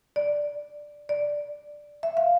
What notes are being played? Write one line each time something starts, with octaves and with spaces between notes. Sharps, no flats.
D5
D5
E5
F5